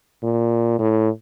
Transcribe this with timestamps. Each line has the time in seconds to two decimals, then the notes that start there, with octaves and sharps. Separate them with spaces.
0.23 A#2
0.79 A2